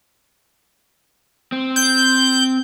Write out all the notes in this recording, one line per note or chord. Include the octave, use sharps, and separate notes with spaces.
C4
G6